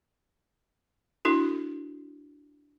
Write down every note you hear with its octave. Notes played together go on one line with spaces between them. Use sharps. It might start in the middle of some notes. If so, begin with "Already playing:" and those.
D4 E4 F#4 A4